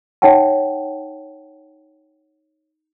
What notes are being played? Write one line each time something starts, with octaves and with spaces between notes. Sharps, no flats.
D#4 C#5 F#5 G5 A5